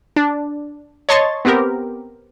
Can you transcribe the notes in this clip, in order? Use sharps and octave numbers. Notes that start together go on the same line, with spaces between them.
D4
C#5 D#5 A5 C6 C#6 A6
B3 C4 G4 A#4